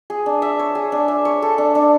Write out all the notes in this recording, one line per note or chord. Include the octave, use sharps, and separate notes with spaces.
G#4
D4
E5
C#5
G#4
D4
E5
C#5
A4
D4
D4